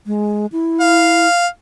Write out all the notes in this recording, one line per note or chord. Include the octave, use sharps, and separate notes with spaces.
G#3
E4
F5